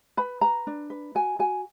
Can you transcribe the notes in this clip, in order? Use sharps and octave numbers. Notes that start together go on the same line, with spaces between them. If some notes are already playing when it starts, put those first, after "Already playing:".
B4 B5
B4 A#5
D4
B4
F#4 G#5
F#4 G#5